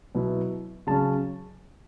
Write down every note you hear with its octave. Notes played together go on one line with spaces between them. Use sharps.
B2 F#3 B3 E4
C#3 F#3 C#4 A5